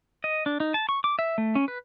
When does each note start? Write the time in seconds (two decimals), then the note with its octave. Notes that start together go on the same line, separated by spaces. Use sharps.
0.24 D#5
0.46 D4
0.60 D#4
0.74 A5
0.89 C#6
1.04 D6
1.19 E5
1.38 A3
1.55 C#4
1.68 B4